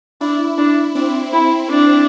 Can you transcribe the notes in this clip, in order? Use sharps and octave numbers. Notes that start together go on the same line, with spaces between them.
D4 E4
D4
C4 D4
E4
D4